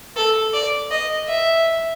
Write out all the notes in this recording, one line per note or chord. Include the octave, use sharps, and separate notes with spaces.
A4
D5
D#5
E5